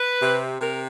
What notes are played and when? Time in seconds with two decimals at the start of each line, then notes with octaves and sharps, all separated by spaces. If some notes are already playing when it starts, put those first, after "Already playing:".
Already playing: B4
0.21 C3
0.61 C3 A#4